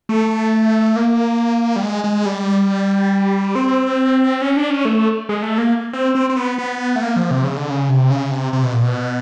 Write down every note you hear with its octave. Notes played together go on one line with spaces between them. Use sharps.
A3
A#3
G3
G#3
G#3
G3
C4
C#4
D4
C#4
A3
G#3
A3
A#3
C4
C4
C4
B3
B3
A3
A#3
F3
C3
C#3
D3
C#3
C3
C#3
C3
C3
B2
A#2
B2